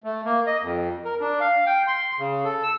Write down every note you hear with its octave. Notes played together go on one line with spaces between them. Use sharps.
A3
A#3
D#5
F2
A#4
D4
F5
G5
C6
C#3
A4
E6